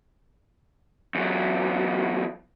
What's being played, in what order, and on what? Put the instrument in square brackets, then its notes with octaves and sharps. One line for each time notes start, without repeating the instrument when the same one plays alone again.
[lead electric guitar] E2 F#3